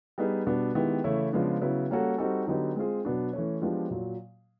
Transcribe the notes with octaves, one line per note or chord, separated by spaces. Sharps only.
G3 B3 D#4 G#4
B2 G3 B3 D4
D#3 G#3 B3 E4 G4
C#3 E3 A3 C#4 E4
C#3 F3 G#3 B3 D4
C#3 F#3 B3 E4
G3 A#3 C#4 F#4 A4
G3 C4 D#4 F#4 A4
D3 F#3 B3 D#4 G4
G#3 C4 F4 G#4
B2 F#3 B3 D4
E3 A3 C#4
F3 G#3 B3 D4 G4
A#2 F#3